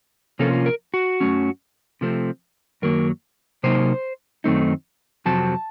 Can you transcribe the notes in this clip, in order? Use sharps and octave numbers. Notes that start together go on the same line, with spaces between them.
C3 F3 A#3 C#4 F4 A4
A#4
F#4
F#2 D#3 F#3 A3 C#4
C3 F3 A3 C4
F#2 D#3 F#3 A#3 A#4
C3 F#3 A#3 D#4 C5
F#2 D#3 A3 C4 D#4
F2 C3 F#3 C4 A5